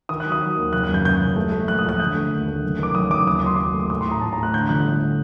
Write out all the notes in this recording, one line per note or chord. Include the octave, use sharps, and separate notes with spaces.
D#3 D#6
F#6
F#3
D#6
F#3
D#2
F#1 F#6
F#6
F#2
G6
F#1 G6
F#1
A3
A3
A#1 F#6
D#6
A#1 F#6
D3 G6
A3
D#2
A3
F#1
D#3 D6
F#1 D#6
F#1 D6
D#2 D#6
D6
F#3 C6
F#3 D6
A3
D6
A2 D#6
A2 C6
A#5
A2 A5
A2 A#5
F#6
D3 G6
G1 F#6
A3